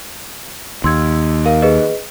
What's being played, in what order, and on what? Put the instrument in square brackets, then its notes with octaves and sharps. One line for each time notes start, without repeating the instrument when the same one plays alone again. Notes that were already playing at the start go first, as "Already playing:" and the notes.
[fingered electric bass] D#2 [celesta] C6 E6 G#6
[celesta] A#4 F5
G#4 B4 D#5